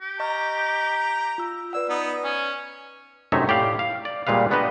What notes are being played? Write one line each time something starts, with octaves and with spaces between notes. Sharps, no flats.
G4
D#5 A#5 C#6 F6
F4 E6
B4 D5 F#5 E6
B3 D#4
C#4 G#5
F#2 C3 A3 D#4 C#5 E5
A2 G4 D5 F5
F5
D5
A#2 G3 G#3 B4 F5
A3 B3 D4 G4 B4 D#5